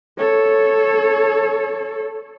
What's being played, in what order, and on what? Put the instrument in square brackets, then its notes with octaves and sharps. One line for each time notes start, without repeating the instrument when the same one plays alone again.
[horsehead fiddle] A4 C#5